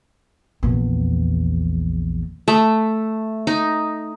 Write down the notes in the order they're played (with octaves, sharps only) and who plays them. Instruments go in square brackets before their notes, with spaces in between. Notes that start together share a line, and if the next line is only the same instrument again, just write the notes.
[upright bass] A#1 E2
[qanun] A3
D#4